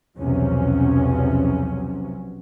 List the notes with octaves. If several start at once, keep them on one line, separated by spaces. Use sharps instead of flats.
B1 E2 C3 F3 F#3 C#4